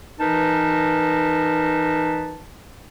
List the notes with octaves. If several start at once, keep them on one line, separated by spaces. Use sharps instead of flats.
E3 D#4 A#4 B4 A5